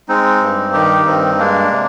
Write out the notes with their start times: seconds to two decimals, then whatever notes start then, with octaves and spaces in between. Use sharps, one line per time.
0.08 G#3 C4 D#4
0.41 G2
0.73 D#3 D#4 G4
1.06 G2 C4 D#4
1.39 G#3 A#3 D4
1.71 C3